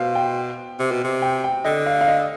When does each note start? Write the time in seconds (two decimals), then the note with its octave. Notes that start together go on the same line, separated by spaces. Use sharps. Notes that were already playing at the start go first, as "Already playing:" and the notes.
Already playing: B2 C5 F5
0.15 G5
0.79 C3
0.91 B2
1.04 C3
1.22 G5
1.44 G5
1.64 D3 D#5
1.86 F5
2.01 F5
2.08 D#5